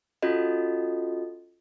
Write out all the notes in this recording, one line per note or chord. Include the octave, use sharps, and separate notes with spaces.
C#4 F4 F#4 A4 D#5